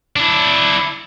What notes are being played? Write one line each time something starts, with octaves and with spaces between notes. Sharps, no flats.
D4 E4